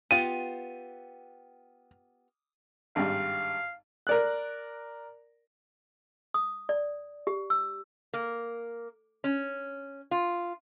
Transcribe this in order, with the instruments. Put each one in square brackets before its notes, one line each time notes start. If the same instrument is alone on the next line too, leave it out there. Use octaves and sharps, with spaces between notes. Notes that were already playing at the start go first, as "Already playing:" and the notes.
[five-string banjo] B3 F4 G4 [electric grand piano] D#7
[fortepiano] G#1 G2 G3 [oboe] F5
[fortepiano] A#4 D5 F#6
[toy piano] D#6
D5
G4
E6
[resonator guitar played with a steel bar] A#3
C#4
F4